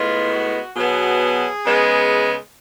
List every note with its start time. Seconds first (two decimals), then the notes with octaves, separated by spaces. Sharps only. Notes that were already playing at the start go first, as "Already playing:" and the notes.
Already playing: A2 G#3 B3 F4
0.32 F#4
0.76 B2 F#3 B3 G#4
1.65 C#3 G#3 B3